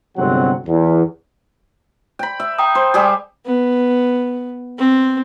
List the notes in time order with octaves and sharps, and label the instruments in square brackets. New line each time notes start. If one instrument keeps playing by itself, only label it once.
[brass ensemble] G1 C3 F#3 G#3 C4 F#5
E2
[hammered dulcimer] G5 B5
E5
[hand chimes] G5 A#5 D#6
[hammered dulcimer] C5
G3 G4 G#4
[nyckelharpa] B3
C4